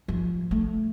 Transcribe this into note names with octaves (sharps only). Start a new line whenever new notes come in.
F3
A3